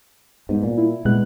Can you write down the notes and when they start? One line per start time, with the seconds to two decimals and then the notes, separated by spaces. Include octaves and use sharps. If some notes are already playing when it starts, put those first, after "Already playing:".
0.49 G#2 G3 B3
0.63 A#2
0.77 E4
1.05 A#2 G3 G#3 B3 F#6